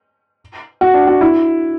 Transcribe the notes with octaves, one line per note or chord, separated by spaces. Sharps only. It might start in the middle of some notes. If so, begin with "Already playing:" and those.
F#4
D4
F#4
E4